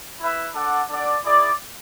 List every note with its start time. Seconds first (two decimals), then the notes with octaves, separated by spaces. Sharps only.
0.20 E4 B4 E5
0.55 D4 A4 D5 F#5
0.89 D4 A4 D5 F#5
1.25 E4 G#4 D5